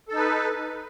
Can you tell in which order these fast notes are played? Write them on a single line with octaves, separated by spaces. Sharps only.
A4 D#4 B4